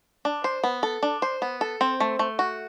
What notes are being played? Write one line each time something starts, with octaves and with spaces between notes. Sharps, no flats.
D4
C5
B3
A4
D4
C5
B3
A4
C4
A3
A3
F#4